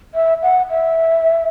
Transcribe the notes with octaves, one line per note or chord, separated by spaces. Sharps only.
E5
F#5
E5